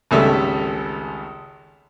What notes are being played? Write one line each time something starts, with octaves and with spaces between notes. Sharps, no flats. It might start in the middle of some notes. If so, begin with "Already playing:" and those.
G#1 C#2 G3 A3 A4 E5